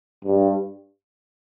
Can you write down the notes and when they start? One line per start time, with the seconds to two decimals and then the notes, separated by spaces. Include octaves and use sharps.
0.25 G2